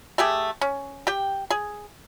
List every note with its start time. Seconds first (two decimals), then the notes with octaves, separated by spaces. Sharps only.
0.18 A3 G4 G#4
0.61 C#4
1.07 G4 G5
1.50 G#4